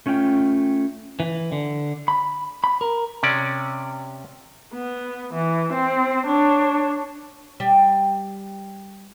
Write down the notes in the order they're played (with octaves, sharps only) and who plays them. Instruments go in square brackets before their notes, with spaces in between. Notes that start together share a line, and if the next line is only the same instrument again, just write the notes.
[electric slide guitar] A3 C#4 F4 F5 G5
[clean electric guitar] E3
D3
B5
B5
A#4
[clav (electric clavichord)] C3 C#4 D5
[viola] B3
E3
C4
D4 C#5
[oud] G3